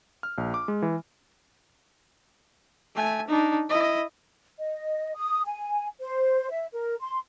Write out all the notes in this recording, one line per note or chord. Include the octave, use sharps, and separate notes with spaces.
F6
A#1
D6
G#3
E3
A3 G#5
D4 D#4
E4 D#5
D#5
D#6
G#5
C5
E5
A#4
C6